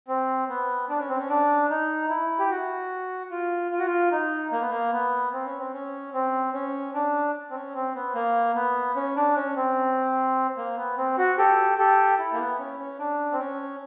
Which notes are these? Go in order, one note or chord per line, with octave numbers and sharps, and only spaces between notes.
C4
B3
D4
C#4
C4
C#4
D4
D#4
E4
G4
F#4
F4
F4
F#4
F4
D#4
A#3
B3
A#3
B3
C4
C#4
C4
C#4
C4
C#4
D4
C4
C#4
C4
B3
A#3
B3
C#4
D4
C#4
C4
A#3
B3
C4
F#4
G4 A4
G4 A4
E4
A#3
B3
C#4
C#4
D4
C4
C#4